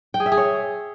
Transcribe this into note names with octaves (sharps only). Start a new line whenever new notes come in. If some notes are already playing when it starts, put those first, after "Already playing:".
G5
G#4
E5
G#4
C#5